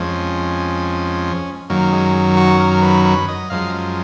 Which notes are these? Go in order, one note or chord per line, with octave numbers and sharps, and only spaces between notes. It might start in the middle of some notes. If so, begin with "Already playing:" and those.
Already playing: F2 F3 G#3 C#4
F#2 D#3 F#3 A#3
G#3
F#4
A#4
B4
B4
D#5
F#2 F3 G#3 F5